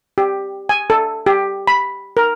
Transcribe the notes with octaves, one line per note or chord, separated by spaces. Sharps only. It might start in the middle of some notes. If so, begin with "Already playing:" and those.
G4
G#5
A4
G4
B5
A#4